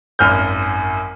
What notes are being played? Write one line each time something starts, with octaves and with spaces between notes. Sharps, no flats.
G#1 F#2 F6 G6